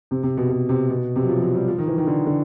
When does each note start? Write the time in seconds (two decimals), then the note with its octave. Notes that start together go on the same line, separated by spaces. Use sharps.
0.11 C3
0.23 C3
0.37 B2
0.49 B2
0.69 C3
0.89 B2
1.16 C3
1.23 F#3
1.29 F3
1.42 F#3
1.55 G3
1.68 F3
1.78 D#3
1.88 E3
1.98 D#3
2.07 D3
2.26 D3